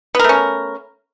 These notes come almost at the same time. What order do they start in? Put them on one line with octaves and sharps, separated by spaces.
B3 A#4 A3 C#4